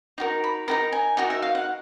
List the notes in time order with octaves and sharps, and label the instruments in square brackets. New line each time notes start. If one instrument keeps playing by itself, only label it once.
[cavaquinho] D#4 F#4 A#4
B5
D#4 F#4 A#4 A#5
G#5
D#4 F#4 A#4 G#5
E5
F5
F#5